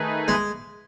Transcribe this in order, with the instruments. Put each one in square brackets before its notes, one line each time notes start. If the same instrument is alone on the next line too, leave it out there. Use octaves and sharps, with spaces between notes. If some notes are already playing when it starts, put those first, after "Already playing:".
Already playing: [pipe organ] D#3 A3 D#4 G#4 B4
[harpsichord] G#3